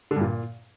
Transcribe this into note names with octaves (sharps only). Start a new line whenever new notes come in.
D3
G2
A#2